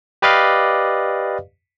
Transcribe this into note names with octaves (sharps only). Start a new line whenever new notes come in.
G4 B4 D5 D#5 F5